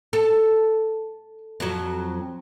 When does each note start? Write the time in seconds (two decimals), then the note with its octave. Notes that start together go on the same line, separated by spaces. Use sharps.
0.13 A4
1.60 F2 F#3